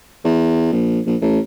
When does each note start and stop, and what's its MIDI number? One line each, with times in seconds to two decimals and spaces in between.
0.24 0.70 40
0.72 1.00 34
1.06 1.16 34
1.21 1.39 33